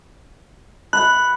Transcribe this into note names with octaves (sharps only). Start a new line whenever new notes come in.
F#5 B5 F#6